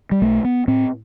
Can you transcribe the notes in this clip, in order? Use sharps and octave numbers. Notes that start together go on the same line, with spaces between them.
G3
B1 A3
B3
A2 C4